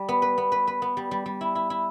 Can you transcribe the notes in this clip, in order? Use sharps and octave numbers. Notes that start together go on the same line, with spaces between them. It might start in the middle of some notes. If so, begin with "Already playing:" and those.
Already playing: G3
B3
B4
B3
B4
B4
B3
G3
G3
G3
E4
E4
E4